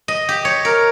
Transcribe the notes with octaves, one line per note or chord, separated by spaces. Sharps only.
D#5
G4
C#5
A#4